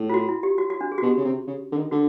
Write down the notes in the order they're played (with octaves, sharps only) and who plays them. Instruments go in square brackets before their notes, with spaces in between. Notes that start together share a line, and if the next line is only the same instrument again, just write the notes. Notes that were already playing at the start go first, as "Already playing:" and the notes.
Already playing: [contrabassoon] A2
[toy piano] F4
F#4
E4
G4
F#4
F#4
D4
G#4
F#4
[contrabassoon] B2 [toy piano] G4
[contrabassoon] C#3
C3
C#3
D3
D#3
[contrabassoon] D3 [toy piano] F#4